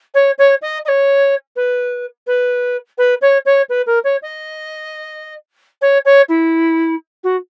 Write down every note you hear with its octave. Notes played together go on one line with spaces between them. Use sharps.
C#5
C#5
D#5
D#5
C#5
B4
B4
B4
C#5
C#5
B4
A#4
C#5
D#5
C#5
C#5
E4
F#4